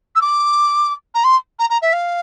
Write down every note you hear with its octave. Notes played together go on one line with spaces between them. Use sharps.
E6
D6
A#5
C6
A#5
A#5
E5
F5